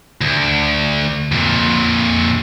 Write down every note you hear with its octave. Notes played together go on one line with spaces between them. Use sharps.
D2
F2 A#2